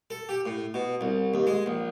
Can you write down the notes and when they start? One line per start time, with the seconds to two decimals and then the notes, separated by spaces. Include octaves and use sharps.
0.10 A4
0.29 G4
0.46 A2
0.74 B2
1.01 C2
1.34 D#2
1.47 G#3
1.66 A#1